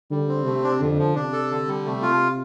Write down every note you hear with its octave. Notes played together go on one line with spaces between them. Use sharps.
D3 G3
C4
C3 A3
D4
F2 D3
F3
C3 D4
A4
D3
G3
C3 A3
F4